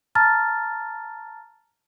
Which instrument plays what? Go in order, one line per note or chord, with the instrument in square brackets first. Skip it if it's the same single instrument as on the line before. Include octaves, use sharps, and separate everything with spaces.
[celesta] A5 A#5 F6 A6